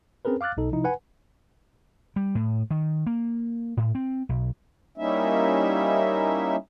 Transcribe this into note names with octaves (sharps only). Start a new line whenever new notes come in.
C4 C#4 G#4 A#4 B4
F5 D6 F6 F#6 A6
B1 B2 D#4 A4
C3 F3 D#4 E4
B4 F#5 G#5
G3
A2
D#3
A#3
A2
C4
B1
G3 A#3 C#4 D#4 E4 E5